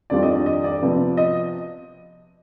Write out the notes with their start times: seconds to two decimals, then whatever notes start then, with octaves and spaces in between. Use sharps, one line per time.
0.10 F2 D#3 G3 D4 F4 D5
0.23 D#5
0.35 D5
0.46 D#5
0.64 D5
0.82 C3 F3 B3
1.17 D#5